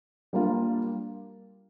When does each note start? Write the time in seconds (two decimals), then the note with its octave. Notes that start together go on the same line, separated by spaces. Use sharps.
0.33 G3 A#3 D4 F4